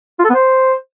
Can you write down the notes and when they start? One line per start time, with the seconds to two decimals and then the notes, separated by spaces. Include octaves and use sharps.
0.19 F4
0.24 A4
0.30 B3
0.35 C5